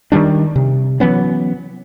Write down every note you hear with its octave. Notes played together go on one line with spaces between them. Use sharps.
D#3 F3 G3 D4
C3
E3 F#3 B3 C#4